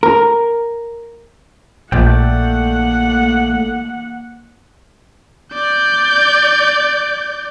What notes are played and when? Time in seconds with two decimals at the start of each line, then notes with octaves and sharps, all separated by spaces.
0.03 A#4
1.92 A#1 A3 A#3 D5 F#5 G5
5.54 D5 G6